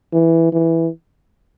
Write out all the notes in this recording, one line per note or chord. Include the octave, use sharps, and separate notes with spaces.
E3
E3